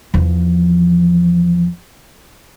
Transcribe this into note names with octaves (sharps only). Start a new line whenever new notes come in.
E2 F3